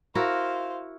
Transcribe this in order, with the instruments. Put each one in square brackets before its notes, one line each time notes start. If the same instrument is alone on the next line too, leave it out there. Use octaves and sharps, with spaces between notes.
[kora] E4 F#4 A#4 [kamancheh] C5 F5